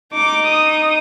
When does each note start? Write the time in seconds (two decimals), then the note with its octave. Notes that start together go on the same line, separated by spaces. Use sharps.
0.13 D#4 D6
0.47 D#6